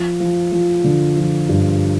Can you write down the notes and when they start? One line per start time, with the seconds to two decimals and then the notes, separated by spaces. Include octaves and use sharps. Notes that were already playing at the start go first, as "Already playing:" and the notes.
Already playing: F3
0.20 F3
0.52 F3
0.84 D3
1.17 F3
1.49 G2